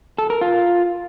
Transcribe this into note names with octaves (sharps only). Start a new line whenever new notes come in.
A4
A#4
F4